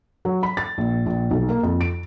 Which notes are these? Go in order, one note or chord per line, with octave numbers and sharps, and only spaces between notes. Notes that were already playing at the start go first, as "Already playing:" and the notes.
F#3
B5
A6
A#1
A#1
B1
A#3
F2
D7